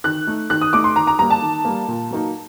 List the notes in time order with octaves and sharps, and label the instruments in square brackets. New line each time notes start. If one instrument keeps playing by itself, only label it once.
[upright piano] D#3 F#6
A3 D#4
D#3 F#6
D#6
A3 D#4 D6
C6
D#3 A#5
A#5
G3 A#3 A#5
A5
D#3
G3 A#3
A#2
F#3 A#3 D#4